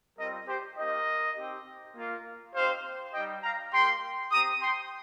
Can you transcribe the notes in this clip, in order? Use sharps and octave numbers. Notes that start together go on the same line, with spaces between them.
G3 C4 F4 A#4 D#5
G4 C5
A#3 D#4 G4 A#4 D#5
C4 D#4 G4
A#3 F4
C4 D#4 G4 C5 F5
G3 D#4 G4 D#5 G5
F5 A#5
A#3 G4 G5 C6
C4 G4 A#5 D#6
G5 C6